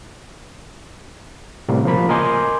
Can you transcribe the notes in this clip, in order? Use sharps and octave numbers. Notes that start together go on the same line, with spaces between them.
A2 C3 G3 A#3
C#3 F3 A#3 B5
A#4 D#5 G#5 C6 D6 G6